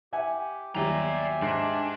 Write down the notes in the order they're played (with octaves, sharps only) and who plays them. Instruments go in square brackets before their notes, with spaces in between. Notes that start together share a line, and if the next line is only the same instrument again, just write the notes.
[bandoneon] G4 [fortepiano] E5 F#5 G#5
[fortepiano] D#2 F#3 G3 [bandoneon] G4 E5 G#5 [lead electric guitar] D5 A#5
[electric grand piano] G#2 C7 [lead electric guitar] D4